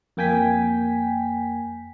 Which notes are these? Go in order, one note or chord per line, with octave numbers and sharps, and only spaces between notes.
F2 A#3 G5 G#5 B6